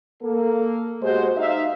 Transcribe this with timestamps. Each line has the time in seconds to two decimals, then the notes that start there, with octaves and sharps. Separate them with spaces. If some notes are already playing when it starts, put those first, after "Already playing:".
0.23 A#3 A4
1.02 B2 G#3 F#4 G4 C5
1.37 D#4 E5 F5